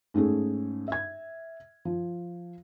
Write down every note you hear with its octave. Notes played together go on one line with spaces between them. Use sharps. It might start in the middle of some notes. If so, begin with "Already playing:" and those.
G#2 A3 C#4 G#4
E5 G#6
F3